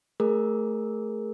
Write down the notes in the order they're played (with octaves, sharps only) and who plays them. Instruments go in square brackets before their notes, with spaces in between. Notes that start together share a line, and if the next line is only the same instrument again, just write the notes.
[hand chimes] A3 G#4 A#4